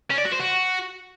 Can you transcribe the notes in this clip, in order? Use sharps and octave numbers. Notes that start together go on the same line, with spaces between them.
C#4
D5
F#4
C5
F#4